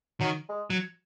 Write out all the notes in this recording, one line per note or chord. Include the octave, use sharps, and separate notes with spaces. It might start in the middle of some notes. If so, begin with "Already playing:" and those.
D#3 F#3
G#3
F#3